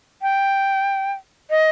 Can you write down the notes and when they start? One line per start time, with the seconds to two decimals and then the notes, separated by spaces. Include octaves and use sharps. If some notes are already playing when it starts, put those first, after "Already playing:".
0.22 G5
1.50 D#5